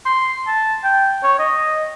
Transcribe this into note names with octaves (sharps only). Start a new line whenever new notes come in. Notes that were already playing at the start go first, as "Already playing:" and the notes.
C6
A5
G5
C#5
D#5